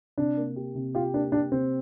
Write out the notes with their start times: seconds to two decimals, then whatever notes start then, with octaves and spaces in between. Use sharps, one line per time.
0.18 C3 D4
0.37 A#3
0.56 G4
0.75 C3
0.95 F4 G4
1.14 A#3 D4
1.32 D4 G4
1.51 C3 C4